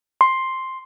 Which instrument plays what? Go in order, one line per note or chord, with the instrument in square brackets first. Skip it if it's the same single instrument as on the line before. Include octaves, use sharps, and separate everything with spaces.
[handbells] C6